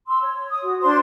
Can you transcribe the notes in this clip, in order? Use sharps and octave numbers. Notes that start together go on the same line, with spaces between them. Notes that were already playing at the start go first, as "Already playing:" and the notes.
C6 E6
C#5
D#6
F#4
D4 C5 C6